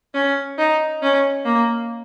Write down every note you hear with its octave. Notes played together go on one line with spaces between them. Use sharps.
C#4
D#4
C#4
A#3